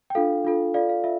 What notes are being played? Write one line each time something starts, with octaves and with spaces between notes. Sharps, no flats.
G5
D4 F4 A4 F5
D4 F4 A4
F4 A4 D5 F5
F5
F4 E5